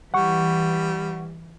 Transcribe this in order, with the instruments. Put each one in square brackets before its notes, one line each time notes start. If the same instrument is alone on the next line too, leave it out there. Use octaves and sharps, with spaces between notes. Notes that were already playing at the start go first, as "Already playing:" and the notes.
[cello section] E3 [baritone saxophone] G3 [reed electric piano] F#5 C#6